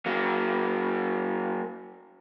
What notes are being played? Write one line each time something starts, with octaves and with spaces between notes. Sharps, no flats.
F#3 A#3